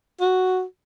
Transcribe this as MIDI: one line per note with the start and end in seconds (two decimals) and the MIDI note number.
0.20 0.63 66